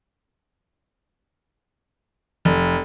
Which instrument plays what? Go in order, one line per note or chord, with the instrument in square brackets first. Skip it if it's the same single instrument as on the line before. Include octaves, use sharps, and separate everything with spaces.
[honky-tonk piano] F1